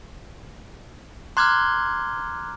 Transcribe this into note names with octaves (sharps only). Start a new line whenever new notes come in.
A#5 C6 D6 F6 F#6 G#6